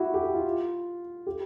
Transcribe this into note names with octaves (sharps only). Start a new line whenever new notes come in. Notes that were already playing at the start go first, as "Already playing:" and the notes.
Already playing: E4 F#4 G4
G4
F#4
F4
G4